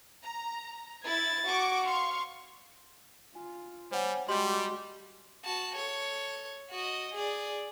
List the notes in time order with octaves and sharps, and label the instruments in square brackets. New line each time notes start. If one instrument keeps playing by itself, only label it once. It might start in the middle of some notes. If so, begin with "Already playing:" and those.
[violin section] A#5
[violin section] E4 [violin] G#6 A6
[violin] F#4 [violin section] C#6 D6
[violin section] F5 C#6 [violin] C6
[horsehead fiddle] F4 [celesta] G#5
[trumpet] G3 [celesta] C5 C#5 F#5 [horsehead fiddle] G#5
[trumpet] G3 [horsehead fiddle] G#3 F#4 [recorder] G4 [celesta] D#5 C6 F#7
[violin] F#4 A5
A4 C#5
F#4 D#5
G#4 D5